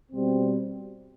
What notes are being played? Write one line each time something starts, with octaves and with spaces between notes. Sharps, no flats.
B2 G3 C4